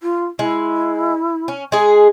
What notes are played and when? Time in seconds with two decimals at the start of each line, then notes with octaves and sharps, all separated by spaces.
0.02 F4
0.39 G#3 E4
1.48 C#4
1.72 G#3 G#4 G#5